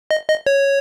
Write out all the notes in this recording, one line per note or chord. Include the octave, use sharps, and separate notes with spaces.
D#5
D#5
C#5